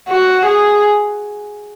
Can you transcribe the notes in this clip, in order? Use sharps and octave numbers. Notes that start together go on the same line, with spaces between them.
F#4
G#4